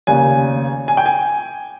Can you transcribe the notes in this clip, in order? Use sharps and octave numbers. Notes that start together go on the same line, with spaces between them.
F1 D#2 C#3 G#5
G#5
G5
G#5